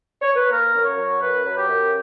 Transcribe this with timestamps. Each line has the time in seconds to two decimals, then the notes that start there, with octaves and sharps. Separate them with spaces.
0.22 C#5
0.36 B4
0.50 A#3 A#4
0.74 F#2
0.85 C#5
0.97 F#3
1.20 F#2 B4
1.43 F#3
1.56 G4
1.67 F#2